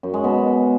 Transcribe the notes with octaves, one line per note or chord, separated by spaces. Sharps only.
F#2
G#3
B2